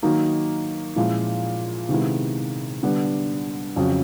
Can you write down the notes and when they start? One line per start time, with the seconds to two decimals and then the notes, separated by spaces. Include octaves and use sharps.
0.03 D#3 F#3 A#3 D#4
0.96 A#2 F3 G#3 C#4 E4
1.89 C3 D#3 G#3 B3 E4
2.83 D3 G3 B3 D4
3.76 F2 C#3 F#3